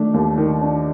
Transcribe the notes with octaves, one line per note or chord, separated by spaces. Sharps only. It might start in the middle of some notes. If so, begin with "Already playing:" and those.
Already playing: D#3 A3 D4
D#2
D#3
D4